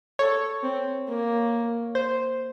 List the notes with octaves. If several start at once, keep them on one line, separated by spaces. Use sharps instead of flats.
A4 C#5
C4
A#3
C5